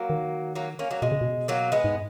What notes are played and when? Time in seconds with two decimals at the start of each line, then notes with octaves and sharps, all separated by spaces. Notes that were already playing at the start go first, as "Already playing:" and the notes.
Already playing: F#3 A#3
0.10 D#3
0.55 F#3 A#3
0.79 A#3 C#4
0.91 F#3 A#3
1.02 B2 G#3
1.12 C#3
1.21 B2
1.48 F#3 A#3
1.72 G#3 B3
1.84 G#2